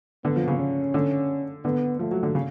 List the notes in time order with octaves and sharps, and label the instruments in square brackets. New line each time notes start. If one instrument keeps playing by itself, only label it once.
[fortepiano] D3 [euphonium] B3
[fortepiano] F3
C#3
[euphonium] C#4
[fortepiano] D3
[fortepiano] D3 [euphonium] B3
[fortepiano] F3 [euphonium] A3
[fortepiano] F#3
D3
C#3